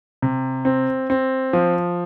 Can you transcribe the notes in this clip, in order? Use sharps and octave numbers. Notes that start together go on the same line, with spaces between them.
C3
C4
C4
F3